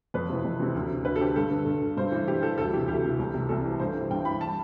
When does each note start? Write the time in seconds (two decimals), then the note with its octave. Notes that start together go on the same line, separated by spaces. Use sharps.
0.14 F2 B4
0.29 C3 E3
0.44 F2
0.60 C3 E3
0.75 D2
0.90 D3
1.05 D2 B4
1.16 A4
1.21 D3 G4
1.36 G2 A4
1.51 D3
1.66 G2
1.81 D3
1.97 G2 C5
2.12 E3
2.27 G2 G4
2.42 E3 A4
2.58 D2 A4
2.73 E3 G4
2.77 C3
2.88 D2 G4
3.04 C3 E3
3.19 C2
3.34 C3 E3
3.49 C2 A4
3.65 C3 E3
3.79 G2 C5
3.95 E3
4.10 G2 G5
4.25 E3 B5
4.41 A5